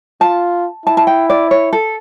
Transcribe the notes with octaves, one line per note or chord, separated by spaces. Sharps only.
F4 A5
E4 A5
A5
G5
D5
C#5
A4